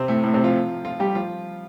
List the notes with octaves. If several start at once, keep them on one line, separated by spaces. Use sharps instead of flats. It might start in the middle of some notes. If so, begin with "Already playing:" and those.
Already playing: C3 C4
A2 A3
A2 A3
C3 C4
F3 F4
F3 F4
G3 G4
F3 F4